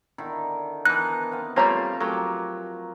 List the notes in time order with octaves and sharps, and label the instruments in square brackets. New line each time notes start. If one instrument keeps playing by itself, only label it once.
[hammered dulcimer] D3 D#3 E4
[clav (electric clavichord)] E3 D#4 [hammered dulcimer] B3 A4 A#4 [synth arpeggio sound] F#6
[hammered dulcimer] B3 C4 F5
[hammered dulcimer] F3 C4 [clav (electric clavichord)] G3 A3 A#3 [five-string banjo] F4 C#5 A#5
[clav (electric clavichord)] F#3 [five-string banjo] A3 G4 [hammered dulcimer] A#4 C#6 D6